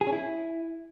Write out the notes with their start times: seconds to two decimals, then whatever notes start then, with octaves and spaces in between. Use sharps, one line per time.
0.01 G#4
0.07 C#4
0.12 E4